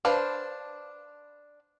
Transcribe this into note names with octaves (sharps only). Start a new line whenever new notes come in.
D4 B4 C5 F5 A5